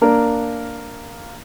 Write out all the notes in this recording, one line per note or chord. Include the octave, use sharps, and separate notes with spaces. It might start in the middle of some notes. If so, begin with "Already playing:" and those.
A#3 D4 A#4